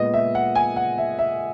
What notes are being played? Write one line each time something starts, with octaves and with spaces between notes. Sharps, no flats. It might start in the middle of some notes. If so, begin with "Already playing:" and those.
Already playing: A#2 G#3 B3 D#5
E5
F#5
G#5
F#5
E5
E5